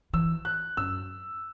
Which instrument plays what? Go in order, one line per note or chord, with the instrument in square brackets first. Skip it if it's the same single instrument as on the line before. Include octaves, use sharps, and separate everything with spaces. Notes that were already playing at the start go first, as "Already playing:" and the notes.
[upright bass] E3 [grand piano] E6
[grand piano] F#6
[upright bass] F#2 [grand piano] E6